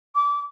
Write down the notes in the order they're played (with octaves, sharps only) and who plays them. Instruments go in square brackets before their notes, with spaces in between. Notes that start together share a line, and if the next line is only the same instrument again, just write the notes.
[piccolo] D6